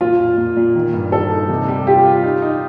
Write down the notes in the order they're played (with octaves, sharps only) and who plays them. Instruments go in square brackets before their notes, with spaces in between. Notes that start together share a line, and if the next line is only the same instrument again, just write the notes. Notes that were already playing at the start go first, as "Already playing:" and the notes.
[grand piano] A#2 [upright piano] F4
[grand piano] A#2
A#2
A#2
D#3
G2
[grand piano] D#3 [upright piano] A4
[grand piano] D#4
C3
G3
[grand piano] F4 [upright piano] G4
[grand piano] F4
D#4
D#4